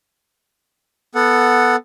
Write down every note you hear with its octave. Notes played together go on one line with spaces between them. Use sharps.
B3 A4 F#5